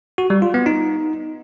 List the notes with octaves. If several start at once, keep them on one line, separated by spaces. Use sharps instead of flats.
F#4
G3
F4
B3
D#4